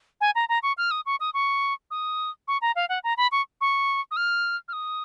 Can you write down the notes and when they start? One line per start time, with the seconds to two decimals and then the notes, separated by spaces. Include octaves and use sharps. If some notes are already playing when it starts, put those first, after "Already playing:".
0.21 G#5
0.35 A#5
0.49 A#5
0.63 C#6
0.77 F6
0.91 D#6
1.06 C#6
1.20 D#6
1.34 C#6
1.91 D#6
2.48 C#6
2.62 A#5
2.76 F5
2.89 F#5
3.04 A#5
3.17 B5
3.32 C#6
3.61 C#6
4.11 D#6
4.17 F6
4.68 F6
4.73 D#6